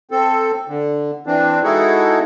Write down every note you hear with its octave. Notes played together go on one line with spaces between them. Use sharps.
C4 A4
D3
E3 C4 D4
G#3 D#4 E4 F#4 G#4 A4